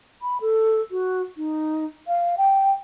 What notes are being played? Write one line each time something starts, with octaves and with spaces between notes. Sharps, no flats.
B5
A4
F#4
D#4
F5
G5